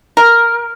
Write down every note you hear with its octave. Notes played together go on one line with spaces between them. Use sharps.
A#4